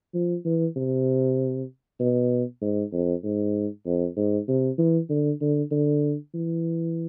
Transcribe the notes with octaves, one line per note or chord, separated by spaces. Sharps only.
F3
E3
C3
B2
G#2
F2
G#2
F2
G#2
C3
E3
D3
D3
D3
E3